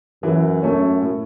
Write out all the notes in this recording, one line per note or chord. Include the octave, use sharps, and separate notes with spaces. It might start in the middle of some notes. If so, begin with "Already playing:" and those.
F#2 E3
F#2 A3 C#4
A2